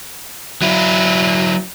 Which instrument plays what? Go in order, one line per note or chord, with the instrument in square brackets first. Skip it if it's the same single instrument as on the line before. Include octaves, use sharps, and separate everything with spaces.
[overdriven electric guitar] F#3 E4